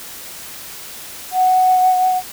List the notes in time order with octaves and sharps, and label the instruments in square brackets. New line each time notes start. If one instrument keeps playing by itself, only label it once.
[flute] F#5